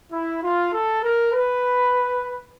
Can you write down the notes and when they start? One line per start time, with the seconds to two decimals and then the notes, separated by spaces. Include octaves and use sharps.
0.12 E4
0.42 F4
0.72 A4
1.03 A#4
1.32 B4